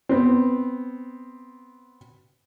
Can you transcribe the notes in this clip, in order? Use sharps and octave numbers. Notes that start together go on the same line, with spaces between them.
B3 C4